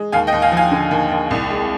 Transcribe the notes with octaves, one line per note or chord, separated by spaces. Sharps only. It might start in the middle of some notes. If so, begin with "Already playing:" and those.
Already playing: G#3
D#2 F5 G#5
D#5 G5
D#2
F5 G#5
F3
F5 G#5
D3
D#2
D#2
C2
G#3